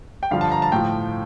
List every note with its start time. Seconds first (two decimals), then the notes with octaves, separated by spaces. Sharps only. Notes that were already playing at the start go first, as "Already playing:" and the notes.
0.23 G5
0.31 G2 D3 F3 F5
0.41 A5
0.51 A#5
0.62 A5
0.72 A2 F3 G5